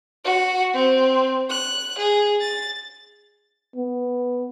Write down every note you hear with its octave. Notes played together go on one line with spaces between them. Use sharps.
F#4
C4
F#6
G#4
A6
B3